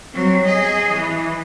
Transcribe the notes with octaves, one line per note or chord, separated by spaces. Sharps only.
F#3 C4
G#4 D#5
E3